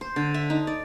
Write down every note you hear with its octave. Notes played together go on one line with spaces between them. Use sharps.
C5
D3
E5
D#4
D5